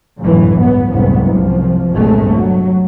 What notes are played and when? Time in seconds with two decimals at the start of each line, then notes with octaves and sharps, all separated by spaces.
0.20 G1 C#2 F#2 A2 E3
0.60 B3
0.91 F#1 C2 G#2 B3
1.33 C2 F3
1.90 G1 C2 A#2 G#3 A3
2.31 F#3